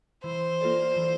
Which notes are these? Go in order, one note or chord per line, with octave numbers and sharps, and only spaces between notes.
E3 C5
A#3 F4 A4 D5
E3